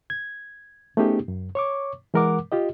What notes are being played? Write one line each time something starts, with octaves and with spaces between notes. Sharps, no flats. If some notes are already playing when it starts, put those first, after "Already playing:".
G#6
A3 B3 C#4 D#4 G4 G#4
F#2
C#5 C#6 D6
E3 G#3 A#4 F#5 D6
F4 G4 D#5